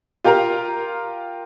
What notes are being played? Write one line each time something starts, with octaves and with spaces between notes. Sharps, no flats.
F4 G4 A#4 F5 A#5